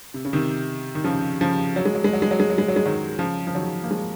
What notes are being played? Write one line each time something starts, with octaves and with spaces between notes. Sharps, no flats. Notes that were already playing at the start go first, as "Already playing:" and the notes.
C3
C#3
C3 D#3
D#3
C#3 F3
C#3 F3
F#3
G#3
F#3
G#3
F#3
G#3
F#3
G#3
F#3
G#3
F#3
G#3
D#3 F#3
C#3 F3
F3
D#3 F#3
A#3
F3 G#3